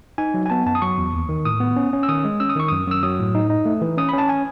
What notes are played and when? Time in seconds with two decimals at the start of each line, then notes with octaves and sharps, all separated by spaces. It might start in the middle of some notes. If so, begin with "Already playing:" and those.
0.18 D#4 G#5
0.34 F#3
0.46 G#5
0.50 B3 A5
0.66 F#2 A5
0.75 D#6
0.82 F#3 C#6
0.98 E2
1.13 D#2
1.29 D#3
1.45 A2 D#6
1.60 B3
1.76 C#4
1.93 C#4
2.03 E6
2.09 D#3 D#6
2.24 G#3
2.40 C#4 E6
2.50 D#6
2.55 D#3 C#6
2.68 F#2 D#6
2.87 F#2 E6
3.03 F#3 D#6
3.19 A2
3.35 D#4
3.50 D#4
3.65 A3
3.81 E3
3.97 C#4 D#6
4.09 C#4 B5
4.18 A5
4.29 G#5